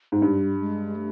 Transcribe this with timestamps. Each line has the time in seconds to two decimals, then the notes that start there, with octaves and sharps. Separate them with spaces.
0.12 G#2 G#3
0.22 G2 G3
0.59 G#3
0.96 A3